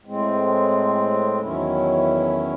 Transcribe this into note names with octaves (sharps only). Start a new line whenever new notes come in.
A2 G#3 C4
E2 D#3 F#3 C#4 E4